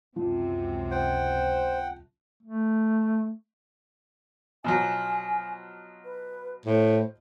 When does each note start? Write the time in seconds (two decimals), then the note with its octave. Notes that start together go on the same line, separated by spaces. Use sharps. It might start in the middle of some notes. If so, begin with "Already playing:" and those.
0.16 C#2 F#2 C3 F3
0.91 C5 F#5 G5
2.43 A3
4.64 B2 F3 F#3 G#5
6.04 B4
6.66 A2 C5